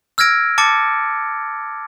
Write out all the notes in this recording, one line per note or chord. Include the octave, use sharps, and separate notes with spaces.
E6 F6 G#6 A#6 D7
A5 D6 A6 C#7